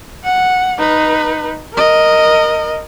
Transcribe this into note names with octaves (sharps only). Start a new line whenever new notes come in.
F#5
D#4 B4
A#4 D#5